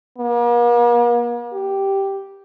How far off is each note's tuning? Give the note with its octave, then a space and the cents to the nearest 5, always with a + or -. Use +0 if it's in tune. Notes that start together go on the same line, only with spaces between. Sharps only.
A#3 +45
G4 -5